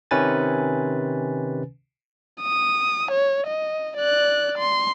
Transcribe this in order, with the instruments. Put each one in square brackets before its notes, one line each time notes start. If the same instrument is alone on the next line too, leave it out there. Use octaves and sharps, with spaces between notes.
[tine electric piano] C3 D#3 C#4 B4 G#5 A6
[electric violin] D#6
C#5
D#5
D5 F#6
C6